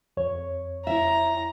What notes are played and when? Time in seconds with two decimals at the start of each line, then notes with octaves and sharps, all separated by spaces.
0.17 F2 C#5
0.87 E4 E5 A#5